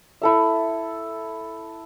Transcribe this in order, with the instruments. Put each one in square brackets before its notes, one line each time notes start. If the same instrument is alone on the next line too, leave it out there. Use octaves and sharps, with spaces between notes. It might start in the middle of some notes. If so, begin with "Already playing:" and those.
[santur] E4 A4 E5